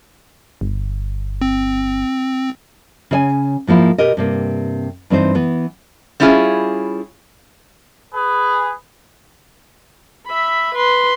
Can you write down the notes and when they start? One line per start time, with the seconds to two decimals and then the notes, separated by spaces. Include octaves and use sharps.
0.61 G1
1.41 C4
3.11 C#3 D#5 G#5
3.67 G#2 F3 A#3 E4
3.98 B2 G4 A#4 D#5
4.17 G2 C3 A#3
5.10 G2 E3 C4 D#4 C5
5.35 E3 B3
6.20 G3 C#4 E4 F4 G#4
8.14 G#4 B4
10.26 E5 B5
10.74 B4 C6